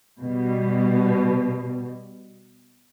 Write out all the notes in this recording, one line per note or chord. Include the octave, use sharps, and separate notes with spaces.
B2 G3